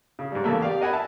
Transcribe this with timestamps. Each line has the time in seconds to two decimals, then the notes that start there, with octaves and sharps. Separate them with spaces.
0.19 C#3
0.32 G#2 G3
0.44 E2 C#3 A3 A#3
0.62 G4 D5 F5
0.80 A#4 D#5 F#5 G#5 B5
0.93 E5 A5